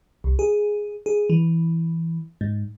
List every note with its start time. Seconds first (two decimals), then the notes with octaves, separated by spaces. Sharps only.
0.24 C2
0.39 G#4
1.06 G#4
1.30 E3
2.41 G#2